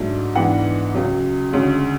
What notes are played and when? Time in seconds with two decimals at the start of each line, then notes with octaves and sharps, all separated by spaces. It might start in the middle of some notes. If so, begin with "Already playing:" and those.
Already playing: G#2 F#3 A3 D4
0.35 G#2 E3 B3 D4 F#5
0.94 C#2 C#3 F#3
1.52 D2 C#3 G#3 C#4